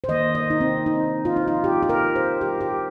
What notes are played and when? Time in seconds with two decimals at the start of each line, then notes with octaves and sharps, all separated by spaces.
0.04 C5
0.08 D#3 A#3 D#5
0.35 D#5
0.50 D#4
0.61 C4
0.86 D#4
1.25 F4
1.36 D#4
1.48 F4
1.64 G4
1.83 G4
1.89 A#4
2.16 C5
2.41 G4
2.61 G4